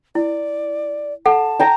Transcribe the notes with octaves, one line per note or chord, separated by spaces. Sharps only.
E4 D5
A4 F#5 A5
G5 A#5